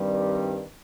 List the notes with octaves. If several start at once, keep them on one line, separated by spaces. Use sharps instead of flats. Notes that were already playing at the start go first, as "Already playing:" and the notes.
Already playing: G2 D#3 G3 C4